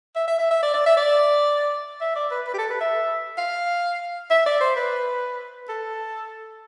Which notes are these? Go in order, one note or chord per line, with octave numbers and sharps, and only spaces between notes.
E5
E5
E5
E5
D5
D5
E5
D5
E5
D5
B4
B4
G4
A4
B4
E5
F5
E5
D5
C5
B4
A4